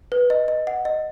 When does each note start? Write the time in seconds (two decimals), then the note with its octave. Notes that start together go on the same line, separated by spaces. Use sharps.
0.12 B4
0.30 D#5
0.48 D#5
0.67 F#5
0.85 D#5